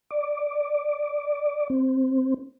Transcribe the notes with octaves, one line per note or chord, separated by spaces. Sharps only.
D5
C4